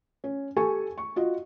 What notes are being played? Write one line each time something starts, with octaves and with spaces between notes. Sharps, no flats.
C#4
G4 A4 G#5 C#6
C#6
F4 F#4 D#5